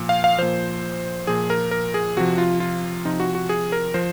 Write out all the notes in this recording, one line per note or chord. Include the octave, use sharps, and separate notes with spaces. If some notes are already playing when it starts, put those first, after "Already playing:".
Already playing: A#2 F3
F5
F5
A#2 F3 C5
A#2 F3 G#4
A#4
A#4
G#4
C3 F3 F#4
F4
F4
C3 F3 D#4
F#4
F#4
G#4
A#4
F3 C5